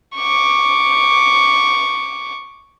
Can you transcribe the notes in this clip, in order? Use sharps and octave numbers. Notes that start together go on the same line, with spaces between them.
C#6 D6